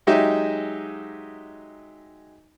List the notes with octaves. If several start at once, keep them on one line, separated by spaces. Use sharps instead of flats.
F#3 G#3 D#4 G4 D#5 E5